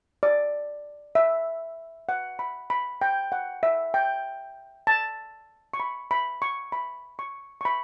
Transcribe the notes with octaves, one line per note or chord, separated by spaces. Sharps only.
D5
E5
F#5
B5
B5
G5
F#5
E5
G5
A5
C#6
B5
B5
C#6
B5
C#6
C#6
B5